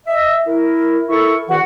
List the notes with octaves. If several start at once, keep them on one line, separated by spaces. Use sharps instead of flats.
D#5 E5
E4 A#4
E4 A4 A#4 C#6
E2 D#3 E3 F#4 F#5